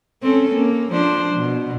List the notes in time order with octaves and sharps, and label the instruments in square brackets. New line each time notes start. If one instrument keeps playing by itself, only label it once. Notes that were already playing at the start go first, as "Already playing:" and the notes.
[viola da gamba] C4 C#4 A4
A#3
F3 D4 C5
B2